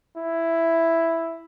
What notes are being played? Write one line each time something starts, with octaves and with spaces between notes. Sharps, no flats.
E4